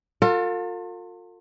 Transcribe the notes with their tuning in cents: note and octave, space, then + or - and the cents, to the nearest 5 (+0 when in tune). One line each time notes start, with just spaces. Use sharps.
F4 +35 A4 +45